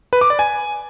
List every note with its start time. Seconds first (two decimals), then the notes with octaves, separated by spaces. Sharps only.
0.13 B4
0.21 D6
0.30 D5
0.39 G#5